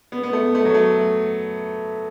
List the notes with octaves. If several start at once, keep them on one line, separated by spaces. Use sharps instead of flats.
B3
B3
A3
A3
F#3
A3